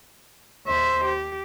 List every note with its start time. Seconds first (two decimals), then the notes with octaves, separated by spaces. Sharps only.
0.67 D#2 C5 E5
1.05 G4